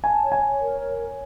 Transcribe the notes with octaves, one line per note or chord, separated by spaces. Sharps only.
G#5 A5
C#5
G#5
C#5
A#4
C#5
C#5